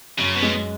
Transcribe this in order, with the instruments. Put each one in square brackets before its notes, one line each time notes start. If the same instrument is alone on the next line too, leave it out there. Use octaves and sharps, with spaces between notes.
[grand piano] F#2 [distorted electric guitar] C#3
[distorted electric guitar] B2
[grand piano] G#3